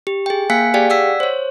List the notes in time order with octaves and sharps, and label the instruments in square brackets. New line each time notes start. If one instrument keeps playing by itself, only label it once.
[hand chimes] G4
G#4 G5
A#3 F5 G#5 F#6 B6 C#7
G4 G#4 D5 F5 G5
D5 F#5 E6 B6
C5 C#5